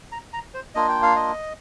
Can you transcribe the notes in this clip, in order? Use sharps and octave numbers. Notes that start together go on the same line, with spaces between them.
A#5
A#5
C5
A#3 D4 F4 D#5
G5
F5
D#5